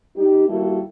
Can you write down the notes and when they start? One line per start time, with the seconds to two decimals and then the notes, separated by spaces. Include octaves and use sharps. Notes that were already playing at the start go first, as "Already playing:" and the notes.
0.16 G3 D#4 G4
0.48 D#3 G3 A#3 E4 F#4 A4